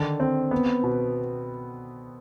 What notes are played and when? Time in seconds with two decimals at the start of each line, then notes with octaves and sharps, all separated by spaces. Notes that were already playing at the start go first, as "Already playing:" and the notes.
Already playing: D3 D#3
0.20 C4
0.51 B3
0.83 B2